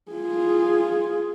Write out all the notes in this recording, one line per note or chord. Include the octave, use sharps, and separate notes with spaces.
F4 G#4